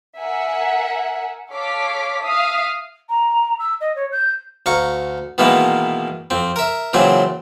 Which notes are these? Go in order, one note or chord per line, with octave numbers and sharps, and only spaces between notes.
A#4 E5 F#5 G#5
A4 C#5 F5 D6 B6
E5 F5 D#6
A#5
E6
D#5
C#5
G6
D2 F5 A#5 C#6
B2 D#3 E3 G#3 A#3 B3
F2 C4
A#4 E5
A#2 C#3 E3 F#3 C4 G#5